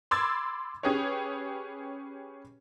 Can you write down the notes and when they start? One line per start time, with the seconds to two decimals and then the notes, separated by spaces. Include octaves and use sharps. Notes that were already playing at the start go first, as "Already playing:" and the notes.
0.11 B5 C6 D6 E6 G#6 A6
0.83 C#4 G4 G#4 B4 C#5